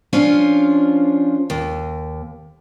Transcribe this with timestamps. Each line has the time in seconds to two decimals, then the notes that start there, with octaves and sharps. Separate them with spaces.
0.13 F3 C#4 D4 F4
1.50 D#2